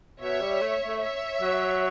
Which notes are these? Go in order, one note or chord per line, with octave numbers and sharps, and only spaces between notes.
B2 C#5 E5
G3
A3
A3
C#5 E5
F#3